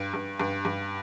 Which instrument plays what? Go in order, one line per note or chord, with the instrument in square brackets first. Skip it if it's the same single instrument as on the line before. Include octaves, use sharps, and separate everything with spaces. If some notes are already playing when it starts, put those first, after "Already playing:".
Already playing: [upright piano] G2
G2
G2
G2